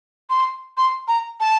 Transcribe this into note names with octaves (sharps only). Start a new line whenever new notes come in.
C6
C6
A#5
A5